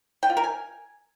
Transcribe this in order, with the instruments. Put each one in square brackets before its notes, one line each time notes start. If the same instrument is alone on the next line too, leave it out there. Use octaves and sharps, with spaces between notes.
[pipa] G5
F4
A#4
G#5